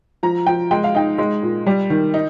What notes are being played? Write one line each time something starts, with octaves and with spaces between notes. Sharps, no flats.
F3 A#5
F3 G5
G#3 G5
F5
D#4 G5
G#3
A#2
G3
D#3
D#4